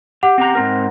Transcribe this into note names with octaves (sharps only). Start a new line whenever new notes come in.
G4 F#5
C4 G4 A#5
G#2 C4 A#4